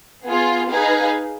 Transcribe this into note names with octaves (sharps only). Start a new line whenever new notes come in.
B3 F4 G#4
D#4 G#4 B4 F5